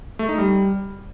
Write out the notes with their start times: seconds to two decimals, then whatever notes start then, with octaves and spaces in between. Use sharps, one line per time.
0.19 A3
0.29 D#4
0.38 G3